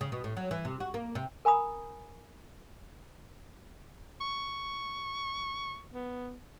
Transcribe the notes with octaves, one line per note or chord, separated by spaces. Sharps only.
C#3
B2
A2
F#3
E3
C3
F#4
A#3
C3
A#4 G#5 A#5 B5 D#6
C#6
B3